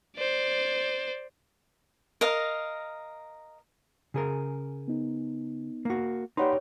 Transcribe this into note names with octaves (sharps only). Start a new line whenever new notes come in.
C5 D5
A#4 D#5 F5
C#3 G#4 A#4
B3 D#4
A#3 F#4
D#4 G4 B4 C#5 D5 F#5 B5 C6